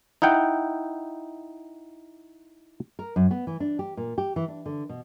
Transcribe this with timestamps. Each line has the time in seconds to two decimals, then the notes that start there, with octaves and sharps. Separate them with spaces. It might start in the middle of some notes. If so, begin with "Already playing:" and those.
0.22 D#4 E4 F#5 G5
2.99 A#4
3.16 F#2
3.31 B3
3.47 E3
3.60 D4
3.79 G4
3.97 A#2
4.18 G4
4.36 E3
4.48 D4
4.66 D3
4.89 B2